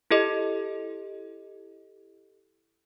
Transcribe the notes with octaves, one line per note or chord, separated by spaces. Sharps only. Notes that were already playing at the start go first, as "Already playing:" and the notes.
E4 G4 A4 D#5